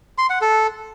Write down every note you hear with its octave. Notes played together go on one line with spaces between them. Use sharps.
C6
F#5
A4